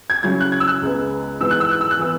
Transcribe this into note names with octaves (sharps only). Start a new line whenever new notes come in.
G#6
C#3 F#3 C#4 E4 G#6
F#6
G#6
E6
F#6
C#2 C#3 G#3 B3
G#2 E3 B3 E4 E6
F#6
E6
F#6
E6
F#6
E3 B3 E4 E6